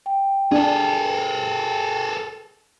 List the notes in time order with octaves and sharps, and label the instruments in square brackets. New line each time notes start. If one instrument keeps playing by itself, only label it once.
[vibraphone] G5
[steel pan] D4 [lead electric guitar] G#4 A4